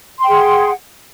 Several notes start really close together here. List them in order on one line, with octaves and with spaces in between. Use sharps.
C6 G5 G#4 F#5